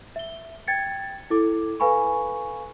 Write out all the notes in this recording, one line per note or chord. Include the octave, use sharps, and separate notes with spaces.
E5 G7
G5 G#6 A6 C#7
E4 A4 D6
A4 B4 F5 G#5 B5 C#6